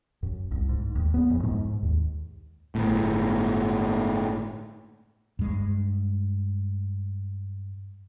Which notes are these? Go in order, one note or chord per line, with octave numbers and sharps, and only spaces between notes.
F#2
C2
G#2
D#2
B3
F2
G#2
D#2
G1 A2
G2 G#3